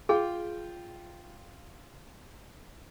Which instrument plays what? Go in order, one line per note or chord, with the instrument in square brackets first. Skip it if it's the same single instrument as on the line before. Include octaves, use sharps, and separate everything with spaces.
[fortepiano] F4 G5 [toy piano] G#4